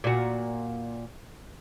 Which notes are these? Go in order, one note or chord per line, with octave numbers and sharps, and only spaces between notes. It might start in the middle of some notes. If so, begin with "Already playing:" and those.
A#2 F#4